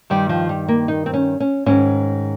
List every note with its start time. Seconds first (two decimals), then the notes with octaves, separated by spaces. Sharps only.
0.10 G2 D#3 G3
0.29 F3
0.49 G3
0.68 A#3
0.88 D#4
1.06 C4
1.14 C#4
1.40 C#4
1.66 G#2 D#3 C#4